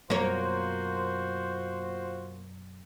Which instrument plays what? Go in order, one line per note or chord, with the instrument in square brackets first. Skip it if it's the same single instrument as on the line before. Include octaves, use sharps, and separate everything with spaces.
[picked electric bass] F#2 B2 [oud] A#3 C#5 [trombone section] F4 F#4 C5